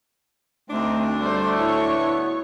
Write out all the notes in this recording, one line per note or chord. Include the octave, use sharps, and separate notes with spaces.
D2 A3 C4 D4 D#4
G3 A3 C5 D5
E4 C#5 C#6
B2 B3